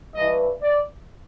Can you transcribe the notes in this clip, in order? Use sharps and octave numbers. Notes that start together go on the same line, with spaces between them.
G2 E3 D#5
D5